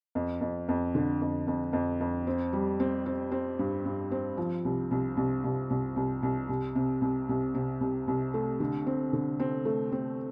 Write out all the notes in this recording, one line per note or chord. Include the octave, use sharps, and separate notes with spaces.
F2
F2
F2
D3
F2
F2
F2
F2
C4
G3
C4
C4
C4
G2
G2
C4
F3
C2
C2
C2
C2
C2
C2
C2
C2
C3
C2
C2
C3
C2
C2
A3
D3
C4
D3
C4
A3
C4